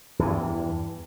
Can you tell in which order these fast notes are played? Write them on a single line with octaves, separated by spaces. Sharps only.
E2 E3 G2